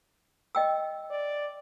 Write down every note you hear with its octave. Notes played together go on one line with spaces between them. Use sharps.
D#5 G5 E6
D5